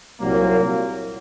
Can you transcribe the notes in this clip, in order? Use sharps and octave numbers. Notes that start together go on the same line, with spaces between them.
C2 A#2 F#3 A#3